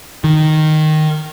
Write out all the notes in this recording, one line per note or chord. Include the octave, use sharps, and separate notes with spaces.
D#3